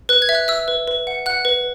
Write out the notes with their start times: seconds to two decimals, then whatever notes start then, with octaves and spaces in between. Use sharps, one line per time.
0.09 B4 F#6
0.22 G#6
0.29 E5
0.35 F#6
0.48 E5 E6
0.68 B4
0.88 B4
1.07 F#5
1.26 F#5 F#6
1.45 B4